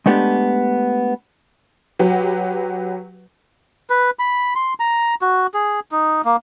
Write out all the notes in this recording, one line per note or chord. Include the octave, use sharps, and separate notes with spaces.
G#3 A3 B3 D4 G4
F#3 F#4 G4 B4
B4
B5
C6
A#5
F#4
G#4
D#4
A#3